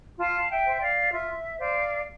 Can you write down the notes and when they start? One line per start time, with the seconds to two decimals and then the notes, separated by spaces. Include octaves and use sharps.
0.19 F4 F5 A5
0.51 E5 G5
0.65 C5
0.77 G5
0.81 D5 F5
1.12 F4 E5
1.58 C5 D5 F5